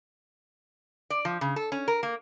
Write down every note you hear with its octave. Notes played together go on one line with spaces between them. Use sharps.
D5
F3
C#3
A4
C#4
A#4
A#3